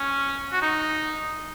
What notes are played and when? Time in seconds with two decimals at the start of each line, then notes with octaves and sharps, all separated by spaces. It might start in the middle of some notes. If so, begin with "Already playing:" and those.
Already playing: C#4
0.52 F#4
0.62 D#4